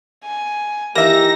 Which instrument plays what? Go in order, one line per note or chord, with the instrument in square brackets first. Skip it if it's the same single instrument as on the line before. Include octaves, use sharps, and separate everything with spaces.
[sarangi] G#5
[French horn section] D#3 E3 G4 [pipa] A#3 E5 [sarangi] D#4 [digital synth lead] A#6